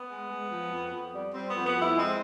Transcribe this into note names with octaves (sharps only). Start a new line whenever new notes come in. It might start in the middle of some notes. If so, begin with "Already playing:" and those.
Already playing: B3
G#3
G#3
F3
F2
F2
G3
G3 C4
F2 B3
B3
F2 E4
G#3 C4